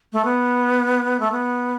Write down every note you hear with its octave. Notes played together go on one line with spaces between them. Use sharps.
A3
B3
A3
B3